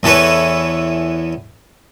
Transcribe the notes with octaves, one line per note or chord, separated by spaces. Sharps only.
E2 E3 A4 B4 C#5